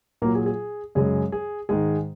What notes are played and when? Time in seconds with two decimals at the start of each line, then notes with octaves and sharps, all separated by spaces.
0.22 A#2 F#3 A#3 A#4
0.35 G#4
0.46 G#4
0.95 F#2 C#3 G#3 G#4
1.32 G#4
1.69 G#2 D#3 G#3 G#4